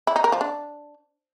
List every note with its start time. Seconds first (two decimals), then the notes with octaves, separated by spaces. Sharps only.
0.07 E4
0.16 D#4
0.24 A#4
0.32 F3
0.41 D4